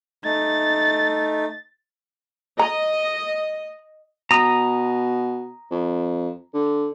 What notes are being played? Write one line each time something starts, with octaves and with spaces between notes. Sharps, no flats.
A3 D#4 A6
D#5 A#5
B2 A#5 D#6
F2
D3